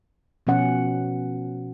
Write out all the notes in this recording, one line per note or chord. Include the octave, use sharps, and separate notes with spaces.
B2 F3 C#4 F#5